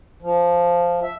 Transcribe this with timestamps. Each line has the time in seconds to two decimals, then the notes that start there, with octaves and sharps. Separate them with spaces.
0.22 F3
1.03 E5